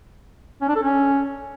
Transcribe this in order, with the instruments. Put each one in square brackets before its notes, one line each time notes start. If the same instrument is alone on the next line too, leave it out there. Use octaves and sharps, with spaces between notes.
[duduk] C#4
D4
A4
C#4